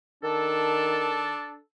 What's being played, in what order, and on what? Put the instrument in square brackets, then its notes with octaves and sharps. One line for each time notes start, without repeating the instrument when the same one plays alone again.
[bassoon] D#3 [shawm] D4 [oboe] A4